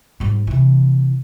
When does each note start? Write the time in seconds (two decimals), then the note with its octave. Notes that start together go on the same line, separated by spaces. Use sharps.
0.20 G#2 G3
0.47 C3 E3